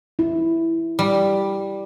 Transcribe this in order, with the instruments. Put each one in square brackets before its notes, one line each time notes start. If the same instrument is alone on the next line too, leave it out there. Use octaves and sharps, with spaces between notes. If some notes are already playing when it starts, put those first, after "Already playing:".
[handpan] E4
[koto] G3